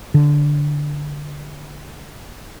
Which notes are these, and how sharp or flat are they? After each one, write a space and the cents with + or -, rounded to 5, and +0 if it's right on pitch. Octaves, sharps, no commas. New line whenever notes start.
D3 -5